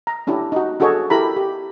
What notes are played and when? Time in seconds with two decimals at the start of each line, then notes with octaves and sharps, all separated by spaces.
0.07 A#5
0.27 C#4 D4 E4 G4
0.52 D#4 F#4
0.80 D4 F#4 G#4 A4 C#5 D#5
1.10 E4 G4 A4 A#4 A#5 B5
1.36 G4